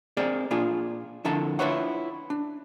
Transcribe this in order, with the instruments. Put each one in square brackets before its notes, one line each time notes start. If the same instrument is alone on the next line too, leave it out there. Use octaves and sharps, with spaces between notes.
[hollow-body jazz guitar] C4 G#4 A#4 D5
A#2 D4 F4 G#4
F2 D3 E4 A#4 A5
D4 E4 F4 B4 C#5 F#5
D4